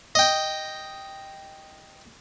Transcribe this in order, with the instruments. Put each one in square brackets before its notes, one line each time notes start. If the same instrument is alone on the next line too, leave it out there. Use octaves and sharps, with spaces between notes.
[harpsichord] D#5 G5